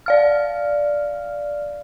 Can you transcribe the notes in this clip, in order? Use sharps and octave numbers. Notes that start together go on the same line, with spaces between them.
D5 F5 F6